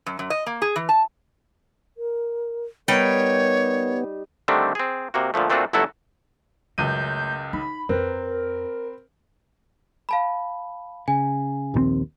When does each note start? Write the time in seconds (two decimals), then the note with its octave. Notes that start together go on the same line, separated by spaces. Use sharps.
0.06 F#2
0.19 F#2
0.30 D#5
0.46 A#3
0.62 G#4
0.76 E3
0.89 A5
1.97 A#4
2.88 G3 B3 D#4 A#4 C#5 G5
4.48 D3 D#3 G3 A3 C4 D4
4.75 C4 G#4
5.14 C3 A#3 F#4
5.34 A#2 D3 F3 A3
5.50 A#2 A3 C4 D4 F4 F#4
5.73 G1 F#3 A3 E4 F#4 A4
6.78 C#2 F#2 D#3 A3 G6 D#7
7.53 D#4 B5
7.89 F2 C4 A#4 B4
10.09 F5 A5 B5
11.08 C#3 G#5
11.74 A#1 D#2 D#3 C4